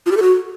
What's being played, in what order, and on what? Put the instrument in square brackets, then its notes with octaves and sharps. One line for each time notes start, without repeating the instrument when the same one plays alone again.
[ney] F4
G4
A4
F#4